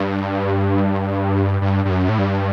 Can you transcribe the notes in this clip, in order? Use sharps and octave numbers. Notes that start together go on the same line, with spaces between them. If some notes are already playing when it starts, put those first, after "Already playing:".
Already playing: G2
G2
G2
F#2
A2
G2